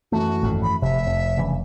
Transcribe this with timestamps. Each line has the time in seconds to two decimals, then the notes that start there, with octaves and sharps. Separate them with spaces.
0.12 F#2 E3 A3 F#4
0.42 G#1 F2 A2
0.63 B5
0.82 F1 C3 E5
1.06 F2
1.37 G2 C#3 E3